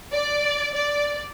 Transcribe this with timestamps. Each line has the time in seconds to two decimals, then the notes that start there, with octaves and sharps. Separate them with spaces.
0.12 D5
0.73 D5